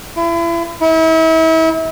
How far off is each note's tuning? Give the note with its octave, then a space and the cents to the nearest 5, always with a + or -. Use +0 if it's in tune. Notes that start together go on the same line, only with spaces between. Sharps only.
E4 +35
E4 -35